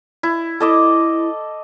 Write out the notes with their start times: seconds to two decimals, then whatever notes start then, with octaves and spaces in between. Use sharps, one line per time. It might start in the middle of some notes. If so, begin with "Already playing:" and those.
0.23 E4
0.60 E4 A4 D#5 D6